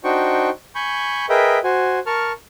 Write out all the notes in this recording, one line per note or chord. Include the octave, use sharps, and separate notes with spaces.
D4 D#4 F#4 C5 G5 C#6
G#5 B5 C#6 G6
G#4 A#4 B4 D#5 E5 G5
F#4 C5 G#5
A#4 A5 C#6 F6